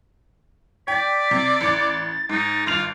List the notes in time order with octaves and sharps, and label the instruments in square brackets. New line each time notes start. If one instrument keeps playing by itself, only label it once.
[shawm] D5 [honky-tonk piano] G5 [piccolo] B6
[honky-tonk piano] C3
[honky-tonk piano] A1 C#7 [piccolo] A6
[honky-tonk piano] G#2 [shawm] D#4
[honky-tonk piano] G#1 G2 F7 [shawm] F4